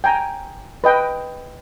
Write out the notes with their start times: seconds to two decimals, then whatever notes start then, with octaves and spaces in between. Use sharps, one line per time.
0.04 G5 G#5 A#5
0.84 B4 D#5 G5